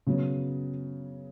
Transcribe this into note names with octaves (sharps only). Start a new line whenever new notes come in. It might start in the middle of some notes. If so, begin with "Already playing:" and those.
C#3 F#3 B3